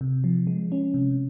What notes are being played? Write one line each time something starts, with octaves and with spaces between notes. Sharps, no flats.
C3
F3
G#3
C#4
C3